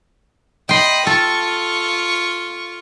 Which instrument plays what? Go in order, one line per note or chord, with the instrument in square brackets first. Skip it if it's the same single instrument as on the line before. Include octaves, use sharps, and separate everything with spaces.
[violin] D#5 B5 [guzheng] G5 C6
[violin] F4 C#6 [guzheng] A4